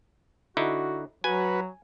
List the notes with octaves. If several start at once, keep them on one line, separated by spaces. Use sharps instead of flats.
D3 D#4 E4 F#4
F#3 F#4 B4 G#5